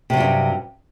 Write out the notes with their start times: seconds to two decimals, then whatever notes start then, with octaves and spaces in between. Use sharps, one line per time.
0.10 C3
0.13 F#3
0.17 E2
0.20 G2